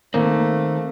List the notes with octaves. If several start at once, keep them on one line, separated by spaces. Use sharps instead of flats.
D#3 A3 A#3 C4